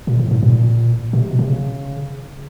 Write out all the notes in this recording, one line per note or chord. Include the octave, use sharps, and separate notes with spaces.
A#2
A2
G#2
A#2
B2
C3
B2
C3
C#3